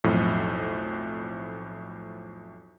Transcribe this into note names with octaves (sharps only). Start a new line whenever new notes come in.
B1 F2 A2